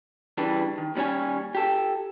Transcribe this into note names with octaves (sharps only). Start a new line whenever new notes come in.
C#3 E3 G3 D4
D#3
D#2 G3 C#4 C#5 G#5
G4 A4